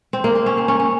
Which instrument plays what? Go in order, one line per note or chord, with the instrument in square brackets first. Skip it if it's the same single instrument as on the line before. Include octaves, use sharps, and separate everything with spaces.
[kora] C4
A#3
C4
C#4
C4
C#4
C#4